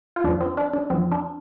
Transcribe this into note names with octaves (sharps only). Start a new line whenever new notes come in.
F4
F2 F3 D4
C4
D4
D4
F2 F3 C4
D4